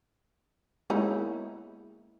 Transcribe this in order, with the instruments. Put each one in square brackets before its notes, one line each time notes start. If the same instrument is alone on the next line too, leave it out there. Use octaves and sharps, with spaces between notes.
[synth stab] G#3 A#3 E4 [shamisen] B3 C#4 D#4